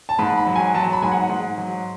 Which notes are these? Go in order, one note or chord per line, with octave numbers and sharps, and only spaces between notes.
A5
G#2 B5
B5
F#3
G#5
F#3 A5
B5
G#2 G#5
F#5
G#2
F#3